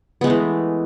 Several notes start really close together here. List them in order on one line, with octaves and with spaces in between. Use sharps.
B3 G#3 A3 E3